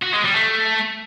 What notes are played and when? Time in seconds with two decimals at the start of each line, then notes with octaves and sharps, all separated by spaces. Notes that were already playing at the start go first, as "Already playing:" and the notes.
0.03 F#4
0.14 G#3
0.25 G3
0.36 A3